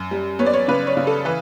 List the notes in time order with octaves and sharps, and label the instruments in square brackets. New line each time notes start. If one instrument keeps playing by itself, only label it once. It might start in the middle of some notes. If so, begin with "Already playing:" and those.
Already playing: [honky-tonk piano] F#2
G3
B3 C#5
D5
C#5
C#3 B4
C#5
C#3
A4
E3 B4